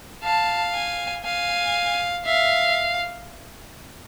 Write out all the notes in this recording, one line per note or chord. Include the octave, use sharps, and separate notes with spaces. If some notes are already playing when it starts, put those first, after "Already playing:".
F5 A5
G#5
F5 G#5
E5 F5